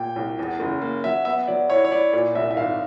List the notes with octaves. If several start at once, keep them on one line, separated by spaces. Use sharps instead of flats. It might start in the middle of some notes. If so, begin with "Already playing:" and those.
Already playing: A#2 G5
C2
E2
F#1
A#3
F#3 E5
B3 E5
F#3 D5
E4 C#5
C#5
E4 D5
A#2 D5
C2 E5
E5
G#1 F5